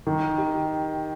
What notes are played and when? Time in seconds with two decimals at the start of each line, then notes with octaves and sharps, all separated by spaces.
0.07 D#3
0.38 G4